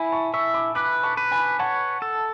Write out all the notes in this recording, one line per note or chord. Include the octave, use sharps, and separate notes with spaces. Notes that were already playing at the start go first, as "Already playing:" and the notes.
Already playing: E4 G#5 B5
A5 C#6
E5 C#6 E6
B5 D6
B4 D6 F#6
A5 C#6
B4
G#5 B5
C#5 F#5 A5
A4